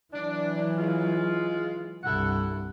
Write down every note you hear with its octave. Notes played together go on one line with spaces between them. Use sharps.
E3 F#3 D4
G#3 F4
C2 G2 E4 A4 F#5